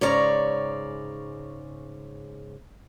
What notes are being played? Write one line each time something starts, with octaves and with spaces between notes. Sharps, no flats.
G#2 C#3 C#5 D5 A#5